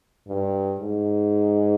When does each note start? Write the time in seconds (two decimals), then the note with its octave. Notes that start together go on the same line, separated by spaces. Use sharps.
0.28 G2
0.80 G#2